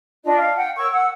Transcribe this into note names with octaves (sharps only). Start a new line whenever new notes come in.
D4 F4 D#5
F5
F#5 G5
A#4 C#5 C#6 E6
F#5 E6